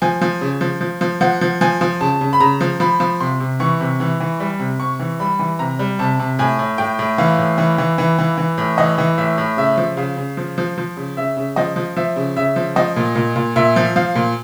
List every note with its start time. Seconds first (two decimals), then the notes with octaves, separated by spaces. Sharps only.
0.02 F3 G#5
0.22 F3
0.41 C#3
0.61 F3
0.81 F3
1.01 F3
1.21 F3 F#5
1.41 F3
1.61 F3 G#5
1.81 F3
2.00 C#3 A5
2.21 C#3
2.33 B5
2.40 C#3 A#5
2.61 F3
2.80 F3 B5
3.00 F3
3.20 C3 C6
3.40 C3
3.60 E3 C#6
3.80 C3
4.00 E3
4.20 E3
4.40 G3
4.59 C3
4.79 C3 C#6
5.00 E3
5.20 G3 B5
5.39 E3
5.59 C3 A#5
5.79 G3
5.99 C3 A5
6.19 C3
6.39 A2 G#5
6.59 A2
6.78 A2 G5
6.99 A2
7.18 E3 F5
7.39 A2
7.58 E3
7.78 E3
7.98 E3
8.19 E3
8.38 E3
8.58 A2
8.78 E3 D#5
8.98 E3
9.18 A2 E5
9.38 A2
9.57 C#3 E5
9.78 F3
9.97 C#3 F5
10.17 C#3
10.37 F3
10.58 F3
10.78 F3
10.97 C#3
11.17 C#3 E5
11.37 C#3
11.56 F3 D#5
11.76 F3
11.96 F3 E5
12.16 C#3
12.36 C#3 E5
12.56 F3
12.76 F3 D#5
12.96 A#2
13.15 A#2
13.36 A#2
13.56 A#2 E5
13.76 F3
13.96 F3 F5
14.15 A#2